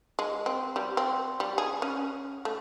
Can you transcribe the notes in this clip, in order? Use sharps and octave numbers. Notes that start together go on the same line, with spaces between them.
G#3
C4
G3
C4
G3
G#4
C#4
A3